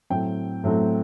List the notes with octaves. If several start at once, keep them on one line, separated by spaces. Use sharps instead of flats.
A2 F#3 A3 C4 G5
A2 F#3 A3 C4